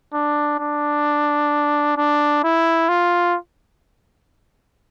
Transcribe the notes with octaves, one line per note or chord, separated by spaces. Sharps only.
D4
D4
D4
E4
F4